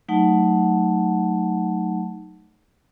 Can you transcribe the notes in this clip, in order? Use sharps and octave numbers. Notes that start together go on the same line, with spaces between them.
F#3 A3 D#4 F#5 A5